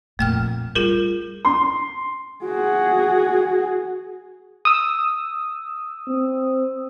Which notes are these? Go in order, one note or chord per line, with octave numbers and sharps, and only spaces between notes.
F2 A#2 A3 G5 F6
G3 F4 G#4 A#4
C6
F#4 G#4
D#6 E6
C4